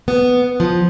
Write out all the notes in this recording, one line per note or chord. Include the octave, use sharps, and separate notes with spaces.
B3
F3